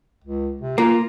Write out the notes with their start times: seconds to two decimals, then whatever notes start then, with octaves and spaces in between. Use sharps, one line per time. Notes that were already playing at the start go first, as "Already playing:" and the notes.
0.24 C#2
0.62 C3
0.78 A#3 F4